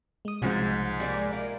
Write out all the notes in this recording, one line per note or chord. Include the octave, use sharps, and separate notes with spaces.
G#3 D#6
C2 G#2 C#3 F3 G#3 C#4 F#4
G3 A#3 D5
E4 F4 A#4